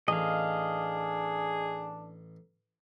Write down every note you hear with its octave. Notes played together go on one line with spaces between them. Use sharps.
A1 D4 G#4 D#5 F5